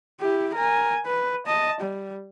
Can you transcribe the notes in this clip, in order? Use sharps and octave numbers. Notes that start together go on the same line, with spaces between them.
E4 G4
A#4 G#5
B4
D#5 A5
G3